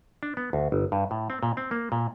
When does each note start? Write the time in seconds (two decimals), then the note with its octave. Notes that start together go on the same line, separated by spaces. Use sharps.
0.23 D4
0.37 B3
0.53 D2
0.72 G1
0.92 G2
1.11 A2
1.30 C4
1.43 A#2
1.57 C4
1.71 A#3
1.92 A#2